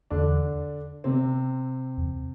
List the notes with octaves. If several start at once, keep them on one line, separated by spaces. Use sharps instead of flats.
E2 D3 D4
C3 C4
E2